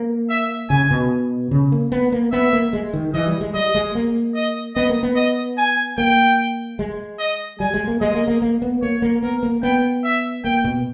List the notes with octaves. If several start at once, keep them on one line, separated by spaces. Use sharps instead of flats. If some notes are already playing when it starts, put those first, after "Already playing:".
Already playing: A#3
E5
C#3 G#5
B2
C#3
A#3
B3
A#3
B3 E5
A#3
G#3
D#3
E3 D#5
G3
G#3
G3 D#5
G#3
A#3
D#5
B3 D#5
A#3
B3
D#5
G#5
A#3 G5
G#3
D#5
G3 G#5
G#3
A#3
G#3 D#5
A#3
A#3
A#3
B3
A#3 C#5
A#3
B3 A#4
A#3
B3 G5
E5
A#3 G5
B2